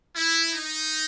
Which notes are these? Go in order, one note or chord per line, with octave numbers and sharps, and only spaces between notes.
E4
D#4